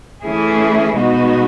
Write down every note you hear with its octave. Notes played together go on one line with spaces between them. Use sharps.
E3 A3 C#4 E4 G#4
B2 G#3 B3 D#4 F#4